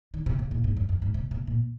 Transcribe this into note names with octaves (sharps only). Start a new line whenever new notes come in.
D#3
C3
C#3
A#2
G#2
F#2
F2
G#2
C3
C3
A#2